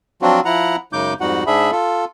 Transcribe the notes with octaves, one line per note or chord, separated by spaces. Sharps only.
F3 F#3 C4 D4 F4 F#4
F3 E4 F#5 A#5
F#2 C#3 G#3 D#4 D6 G6
F2 G#2 G3 D#4 F#4 F#5
G#2 D4 G#4 E5 B5
F4 A4